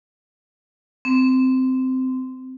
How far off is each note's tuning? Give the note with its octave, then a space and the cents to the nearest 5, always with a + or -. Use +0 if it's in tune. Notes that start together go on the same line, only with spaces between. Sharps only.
C4 -15